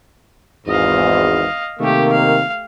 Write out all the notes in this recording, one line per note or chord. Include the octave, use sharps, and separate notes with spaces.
G#1 E2 G#2 D#5 F5
C3 D#3 A3 A#3 G4
F5